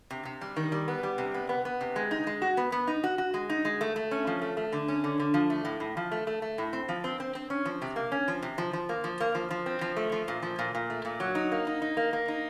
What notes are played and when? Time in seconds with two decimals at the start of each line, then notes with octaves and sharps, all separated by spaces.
0.11 C3
0.25 C3
0.41 G3
0.57 D#3
0.72 G3
0.88 B3
1.03 G3
1.18 C3
1.34 B3
1.49 B3
1.65 B3
1.81 C3
1.96 G#3
2.11 D#4
2.27 G#3
2.42 F#4
2.57 B3
2.72 B3
2.87 D#4
3.04 F#4
3.18 F#4
3.34 G#3
3.50 D#4
3.65 G#3
3.81 A3
3.96 A3
4.11 C#4
4.27 F3
4.42 A3
4.57 A3
4.73 D3
4.88 C#4
5.04 D3
5.20 D3
5.34 F3
5.50 A3
5.65 A2
5.80 A2
5.97 F3
6.11 A3
6.27 A3
6.42 A3
6.58 A2
6.73 C4
6.89 F3
7.04 C4
7.20 C4
7.35 C4
7.50 C#4
7.65 F3
7.82 C3
7.96 A#3
8.12 C#4
8.28 F3
8.42 C3
8.58 F3
8.73 F3
8.89 A#3
9.04 F3
9.20 A#3
9.35 F3
9.51 F3
9.66 C4
9.81 F3
9.97 A3
10.12 F3
10.28 A#2
10.43 F3
10.59 A#2
10.75 A#2
10.90 A3
11.05 A#2
11.20 F#3
11.35 D#4
11.52 A#3
11.67 D#4
11.82 D#4
11.97 A#3
12.13 A#3
12.28 D#4